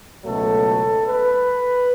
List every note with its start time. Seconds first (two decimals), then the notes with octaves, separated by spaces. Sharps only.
0.24 C#2 B2 F#3 A3 A4
1.04 B4